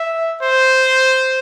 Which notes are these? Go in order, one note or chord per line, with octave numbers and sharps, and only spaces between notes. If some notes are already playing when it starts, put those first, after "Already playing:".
Already playing: E5
C5